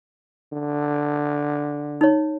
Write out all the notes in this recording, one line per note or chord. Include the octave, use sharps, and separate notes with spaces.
D3
D#4 C#5